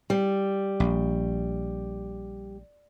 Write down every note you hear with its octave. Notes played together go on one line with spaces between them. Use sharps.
G3
A#1